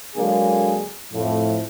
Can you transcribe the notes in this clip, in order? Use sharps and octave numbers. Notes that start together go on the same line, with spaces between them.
D3 F#3 G#3 A#3 D4 G#4
F2 A2 F3